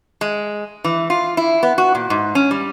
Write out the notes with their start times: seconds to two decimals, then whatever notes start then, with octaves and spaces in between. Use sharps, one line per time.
0.21 G#3
0.84 E3
1.10 F4
1.37 E4
1.63 B3
1.78 F#4
1.95 A#2
2.10 G#2
2.35 C#4
2.51 G3